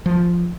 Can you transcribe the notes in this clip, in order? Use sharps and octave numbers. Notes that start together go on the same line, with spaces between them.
F3